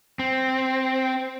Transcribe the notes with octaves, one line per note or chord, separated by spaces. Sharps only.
C4